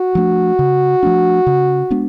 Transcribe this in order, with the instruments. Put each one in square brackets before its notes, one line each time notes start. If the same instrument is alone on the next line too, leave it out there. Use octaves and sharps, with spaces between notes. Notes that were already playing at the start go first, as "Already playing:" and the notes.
Already playing: [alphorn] F#4
[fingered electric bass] F3 A3 D4
C#3
F3 A3 D4
C#3
G#3 B3 D4